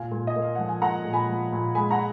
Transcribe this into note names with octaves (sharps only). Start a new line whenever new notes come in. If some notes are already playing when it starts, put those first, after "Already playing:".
Already playing: A#2 F5 G#5
A#2
D#5
A#3
F5
F3 F#5
G#5
A#3 F#5 A#5
A#2
G#5 B5
F3
A#2
G#3 G#5 B5
F#5 A#5